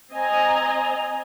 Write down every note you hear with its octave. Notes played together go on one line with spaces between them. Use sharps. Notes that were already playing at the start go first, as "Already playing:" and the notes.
C4 D#5 G#5 A#5